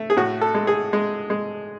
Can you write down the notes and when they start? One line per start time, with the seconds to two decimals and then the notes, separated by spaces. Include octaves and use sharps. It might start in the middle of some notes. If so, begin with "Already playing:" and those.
Already playing: A3
0.10 G#4
0.17 A2 F#4
0.41 A4
0.55 G#3
0.67 G#4
0.93 G#3
1.30 G#3